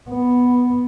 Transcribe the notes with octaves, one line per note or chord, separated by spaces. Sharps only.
B3